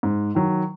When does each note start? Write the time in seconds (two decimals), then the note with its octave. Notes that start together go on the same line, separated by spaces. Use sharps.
0.03 G#2
0.35 D#3 F#3